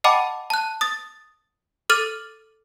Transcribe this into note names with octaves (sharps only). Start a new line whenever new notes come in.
D#5 F#5 G5 A5 B5 D6
A5 F#6
D#6 A6
A4 D6 F6 A6 D#7 F#7